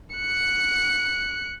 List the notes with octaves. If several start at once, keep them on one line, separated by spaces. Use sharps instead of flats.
F#6 C#7